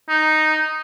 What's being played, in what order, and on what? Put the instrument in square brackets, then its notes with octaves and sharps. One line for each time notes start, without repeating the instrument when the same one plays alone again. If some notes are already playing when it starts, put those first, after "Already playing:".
[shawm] D#4